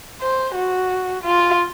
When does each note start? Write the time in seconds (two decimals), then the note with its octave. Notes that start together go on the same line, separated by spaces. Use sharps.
0.22 C5
0.55 F#4
1.23 F4